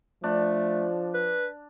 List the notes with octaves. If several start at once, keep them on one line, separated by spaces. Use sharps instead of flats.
F3 A3 D4
B4